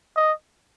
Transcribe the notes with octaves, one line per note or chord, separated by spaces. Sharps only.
D#5